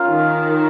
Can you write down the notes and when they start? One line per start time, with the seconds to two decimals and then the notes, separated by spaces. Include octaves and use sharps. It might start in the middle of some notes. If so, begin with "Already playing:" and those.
Already playing: C#4 F4 A#4 F5
0.09 D#3